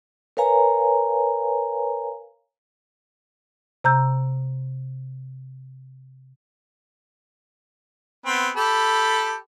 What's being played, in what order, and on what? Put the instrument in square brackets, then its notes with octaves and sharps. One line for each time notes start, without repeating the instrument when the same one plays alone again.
[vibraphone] A#4 B4 C#5 F5 G#5 A#5
[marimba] C3 A#5 E6 G6
[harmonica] B3 C4
G4 A4 B5